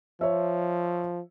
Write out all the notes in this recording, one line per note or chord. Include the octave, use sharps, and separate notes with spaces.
F3 C#5 E5